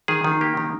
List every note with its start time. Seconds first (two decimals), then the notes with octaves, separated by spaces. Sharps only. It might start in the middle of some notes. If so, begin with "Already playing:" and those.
0.08 D#3 G#4
0.24 D#3
0.41 A#3 G4
0.57 D#3